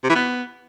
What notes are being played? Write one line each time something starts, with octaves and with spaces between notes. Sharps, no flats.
C3
E3
B3